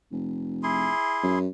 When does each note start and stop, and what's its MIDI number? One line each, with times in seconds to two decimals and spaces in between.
0.12 0.90 29
0.63 1.39 64
0.63 1.39 68
0.63 1.39 84
1.23 1.47 42